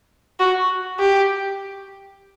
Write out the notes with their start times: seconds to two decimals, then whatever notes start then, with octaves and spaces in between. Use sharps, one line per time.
0.40 F#4
1.00 G4